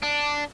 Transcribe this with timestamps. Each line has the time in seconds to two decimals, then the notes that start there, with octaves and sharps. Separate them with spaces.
0.03 D4